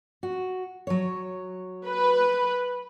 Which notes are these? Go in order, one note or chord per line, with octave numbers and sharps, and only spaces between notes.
F#4
F#3 C#5
B4